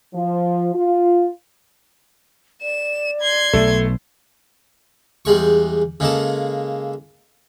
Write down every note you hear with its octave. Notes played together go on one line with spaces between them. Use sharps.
F3
F4
D5 E7
C6 G#6
B1 B2 A3
E2 G3 G#3 C#6
C#3 G#3 A#3 A4